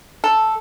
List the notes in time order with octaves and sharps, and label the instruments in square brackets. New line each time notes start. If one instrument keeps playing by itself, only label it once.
[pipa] A4